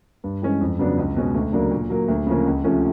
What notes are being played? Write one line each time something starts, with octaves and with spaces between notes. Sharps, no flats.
G2
E3 G#3 C#4
F2
C#3 F#3 B3 D4
C#2
B2 G#3 C#4
D2
C#3 F#3 A#3 D4
A#2
F#3 A#3
D2
C#3 F3 A#3 C#4
C#2
C3 F3 A3 C#4